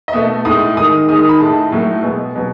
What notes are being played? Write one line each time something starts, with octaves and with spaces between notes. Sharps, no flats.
D#5
B2 A3 E5
A2 G#3 D#6
D#3 G#3 D#6
D#3 G#3 D#6
D#6
B5
A2 G#3 A5
A2 F#3 A3
B2 G#3
B2 F#3